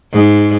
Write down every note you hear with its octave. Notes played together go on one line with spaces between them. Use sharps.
G#2